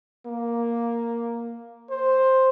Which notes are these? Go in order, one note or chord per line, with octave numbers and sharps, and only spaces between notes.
A#3
C5